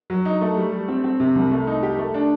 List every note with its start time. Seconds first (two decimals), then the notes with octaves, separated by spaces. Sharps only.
0.10 F#3
0.25 D#4
0.41 A3
0.57 G3
0.72 G3
0.88 C4
1.04 C4
1.20 C3
1.35 C2
1.51 A3
1.67 D#4
1.83 G4
1.99 A3
2.14 D4